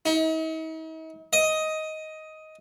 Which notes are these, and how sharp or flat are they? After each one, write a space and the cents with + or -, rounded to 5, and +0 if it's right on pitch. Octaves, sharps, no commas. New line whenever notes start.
D#4 +45
D#5 +10